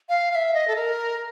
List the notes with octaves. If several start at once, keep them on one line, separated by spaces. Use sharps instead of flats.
F5
F5
E5
D#5
A4
A#4